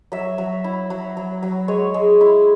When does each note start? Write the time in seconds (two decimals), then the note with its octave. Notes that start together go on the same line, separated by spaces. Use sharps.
0.12 F#3 E5
0.38 F#3
0.64 E4
0.90 F#3
1.17 F#3
1.43 F#3
1.68 G#3 C#5
1.94 G#3
2.21 E4